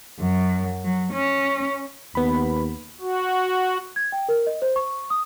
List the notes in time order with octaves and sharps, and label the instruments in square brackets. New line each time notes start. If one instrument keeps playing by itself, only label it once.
[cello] F#2
F#3
C#4
[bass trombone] D#2 [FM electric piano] B3 B5
[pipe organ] F#4
[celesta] G#6
G5
A#4
D#5
C5
C#6
D#6